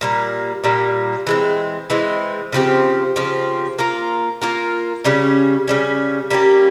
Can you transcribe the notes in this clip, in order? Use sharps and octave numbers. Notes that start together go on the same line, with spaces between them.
A#2 G3 A#3
A#2 G3 A#3
E3 G#3 C4
E3 G#3 C4
C#3 F3 C4 G4
C#3 F3 C4 G4
A#3 F4 A#4
A#3 F4 A#4
C#3 G3 C#4
C#3 G3 C#4
G3 A#3 C#4 G4